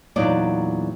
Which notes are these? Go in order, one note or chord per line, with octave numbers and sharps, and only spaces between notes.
E2 A#2 F#3 D#4 D5 D#5